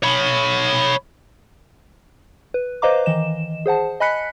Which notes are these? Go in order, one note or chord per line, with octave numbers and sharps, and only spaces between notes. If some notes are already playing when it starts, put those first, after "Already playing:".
C#5 B5
B4
B4 C5 D#5 F5 A#5 D6
D#3 E3 D#5 E7
G#4 C5 F#5 A5
D#5 G#5 B5 F#6 B6 C#7